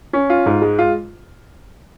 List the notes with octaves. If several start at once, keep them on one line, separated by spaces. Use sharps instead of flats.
C#4
F4
G#2
G#3
F4